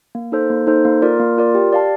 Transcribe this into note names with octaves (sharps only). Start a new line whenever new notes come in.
A#3
D#4 A4 C5
A#3
D#4 A4 C5
A#3
F4 A#4 D5
A#3
F4 A#4 D5
G4
D5 F5 A5